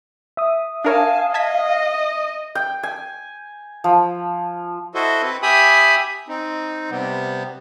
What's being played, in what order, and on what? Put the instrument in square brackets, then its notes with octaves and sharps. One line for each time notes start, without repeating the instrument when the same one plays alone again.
[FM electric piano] E5 D#6
[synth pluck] D4 A#4 C#5 [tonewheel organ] F5 [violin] G#5 A5
[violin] D#5 [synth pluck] A5 G#6 B6
[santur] G5
G#5
F3
[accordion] E4 F#4 A4 C5 D#5
C4 B4
G4 E5 G#5 B5 D#6
C4 D#4
C3 G3 B3